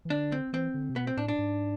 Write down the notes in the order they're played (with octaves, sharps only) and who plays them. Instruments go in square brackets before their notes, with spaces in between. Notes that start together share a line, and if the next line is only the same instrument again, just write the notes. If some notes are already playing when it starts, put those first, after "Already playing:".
[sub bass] E3
[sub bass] D3 [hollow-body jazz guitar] D4
[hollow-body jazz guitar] C4
[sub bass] E3 [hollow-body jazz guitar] C4
[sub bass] D3
C3
[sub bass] B2 [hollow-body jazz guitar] B3
[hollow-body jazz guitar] C4
[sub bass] A2 [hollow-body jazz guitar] D4
[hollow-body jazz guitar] D4
[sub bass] G#2